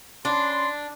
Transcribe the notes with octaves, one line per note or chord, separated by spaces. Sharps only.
C#4 D4 B5 C6